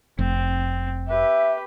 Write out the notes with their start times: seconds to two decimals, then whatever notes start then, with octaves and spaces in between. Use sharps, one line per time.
0.19 F1 C4
1.08 G4 B4 E5